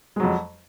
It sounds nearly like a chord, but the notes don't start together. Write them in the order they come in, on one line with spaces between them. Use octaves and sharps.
G#3 F#3 F2